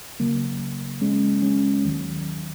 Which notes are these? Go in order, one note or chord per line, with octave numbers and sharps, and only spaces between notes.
C#2 C#3 F#3 A#3
G#3 C#4
G#3 C#4
D#2 D#3 F#3